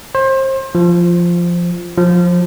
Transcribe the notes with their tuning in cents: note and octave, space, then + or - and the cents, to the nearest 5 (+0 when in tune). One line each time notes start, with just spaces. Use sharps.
C5 +30
F3 -5
F3 +20